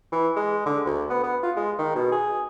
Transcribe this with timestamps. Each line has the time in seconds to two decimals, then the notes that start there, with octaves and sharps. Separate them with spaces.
0.12 E3
0.36 G#3
0.66 D3
0.86 D2
1.10 B3
1.23 B3
1.43 F4
1.56 G#3
1.78 D#3
1.95 B2
2.12 G#4